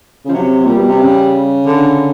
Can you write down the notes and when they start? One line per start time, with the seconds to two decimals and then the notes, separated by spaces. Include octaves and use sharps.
0.25 C#3
0.29 F3
0.33 C3 F#3
0.59 F#3
0.65 A#2 G3
0.77 B2
0.88 C3
1.00 C#3
1.66 D3